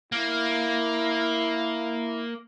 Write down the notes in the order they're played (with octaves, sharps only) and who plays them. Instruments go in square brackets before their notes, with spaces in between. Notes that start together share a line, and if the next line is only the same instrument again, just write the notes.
[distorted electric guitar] A#3 [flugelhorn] E4